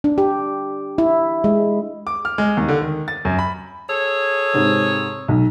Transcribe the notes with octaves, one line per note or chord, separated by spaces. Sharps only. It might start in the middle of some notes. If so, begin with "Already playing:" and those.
D4
G4
E4
G#3
D6
F6
G#3
D#2
D3
D#3
A6
F#2
B5
G#4 A4 C#5
G#2 C3 C4
B1